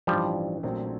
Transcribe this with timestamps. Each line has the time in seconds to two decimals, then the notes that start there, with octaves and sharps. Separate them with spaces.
0.07 A1 G2 E3 F3 G3
0.63 A#1 A#2 F#3 A3 C4